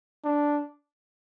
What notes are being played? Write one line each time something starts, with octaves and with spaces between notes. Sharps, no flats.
D4